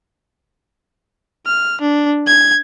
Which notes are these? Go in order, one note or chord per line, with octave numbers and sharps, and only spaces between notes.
F6
D4
G#6